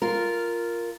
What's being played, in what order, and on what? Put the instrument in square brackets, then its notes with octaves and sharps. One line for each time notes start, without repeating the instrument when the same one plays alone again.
[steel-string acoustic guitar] F4 A#4